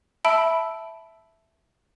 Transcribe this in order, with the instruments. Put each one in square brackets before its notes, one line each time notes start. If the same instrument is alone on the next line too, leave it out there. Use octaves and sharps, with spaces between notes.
[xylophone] E5 A5 B5 E6 D7